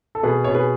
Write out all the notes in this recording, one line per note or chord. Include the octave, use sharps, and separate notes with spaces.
A4
B2 G#4 B4
B2 C#5
G#4 B4